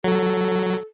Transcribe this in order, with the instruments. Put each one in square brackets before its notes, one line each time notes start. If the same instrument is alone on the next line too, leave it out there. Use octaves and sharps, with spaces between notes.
[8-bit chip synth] F#3 [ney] A4